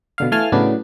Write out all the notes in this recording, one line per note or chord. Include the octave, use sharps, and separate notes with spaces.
B2 D3 F5
E3 A3 F5 G#5 A5 F6
A2 C#3 F#3 B3 D4